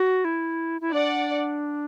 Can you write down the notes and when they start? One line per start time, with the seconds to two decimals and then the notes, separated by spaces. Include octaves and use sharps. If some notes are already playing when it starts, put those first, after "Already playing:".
Already playing: F#4
0.25 E4
0.81 E4
0.92 D4 D5 F#5